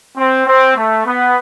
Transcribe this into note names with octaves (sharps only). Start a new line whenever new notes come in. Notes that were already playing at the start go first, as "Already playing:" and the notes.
C4
C4
A3
B3